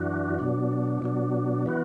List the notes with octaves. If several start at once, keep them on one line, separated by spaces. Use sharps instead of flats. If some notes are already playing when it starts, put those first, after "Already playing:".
Already playing: F#2 E3 D4 F#4
B2 F#3 D4
B2 F#3 D4
E3 B3 F#4